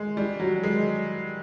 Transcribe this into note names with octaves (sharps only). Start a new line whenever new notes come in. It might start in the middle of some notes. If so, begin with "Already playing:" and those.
Already playing: G#3
G3
F#3
G#3